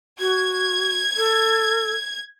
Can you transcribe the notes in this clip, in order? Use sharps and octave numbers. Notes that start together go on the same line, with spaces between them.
F#4 G#6
A4